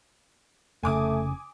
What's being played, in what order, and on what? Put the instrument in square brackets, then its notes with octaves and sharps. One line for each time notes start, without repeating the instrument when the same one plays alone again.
[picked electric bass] F1 C#3 [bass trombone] A3 [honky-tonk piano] G#5 D6 D#6